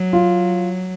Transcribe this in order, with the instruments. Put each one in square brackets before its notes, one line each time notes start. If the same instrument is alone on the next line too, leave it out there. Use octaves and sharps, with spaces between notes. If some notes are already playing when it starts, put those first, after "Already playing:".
Already playing: [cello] F#3
[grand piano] F4